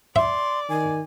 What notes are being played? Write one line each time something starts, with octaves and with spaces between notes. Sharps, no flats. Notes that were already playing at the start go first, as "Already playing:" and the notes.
D5 E5 C6
D#3 G#5